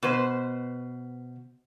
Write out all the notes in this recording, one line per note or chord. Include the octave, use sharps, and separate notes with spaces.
B2 B4 C5